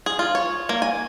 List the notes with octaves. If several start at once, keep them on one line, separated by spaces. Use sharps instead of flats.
G#4
F4
C#5
A#3
G#5